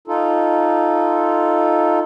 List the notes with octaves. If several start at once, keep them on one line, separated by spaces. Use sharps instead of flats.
D#4 F4 A4